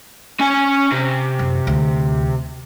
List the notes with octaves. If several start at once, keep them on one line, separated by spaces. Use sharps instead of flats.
C#4 G#5
C3
F#2
D2